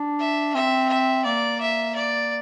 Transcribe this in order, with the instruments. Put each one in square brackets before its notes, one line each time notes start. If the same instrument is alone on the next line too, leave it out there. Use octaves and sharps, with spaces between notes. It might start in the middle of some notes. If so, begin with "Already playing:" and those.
Already playing: [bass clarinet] D4
[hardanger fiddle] E5
[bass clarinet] C4 [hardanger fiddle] E5
[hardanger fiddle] E5
[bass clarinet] A#3 [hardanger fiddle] D5
[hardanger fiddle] E5
D5